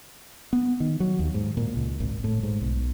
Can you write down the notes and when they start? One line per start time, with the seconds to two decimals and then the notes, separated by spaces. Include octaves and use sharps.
0.53 B3
0.80 D#3
1.00 F#3
1.19 D#2
1.34 G#2
1.57 A#2
1.76 C#2
2.00 G#1
2.24 A2
2.43 G#2
2.61 B1